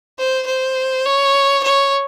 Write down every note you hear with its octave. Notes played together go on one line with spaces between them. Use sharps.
C5
C5
C#5
C#5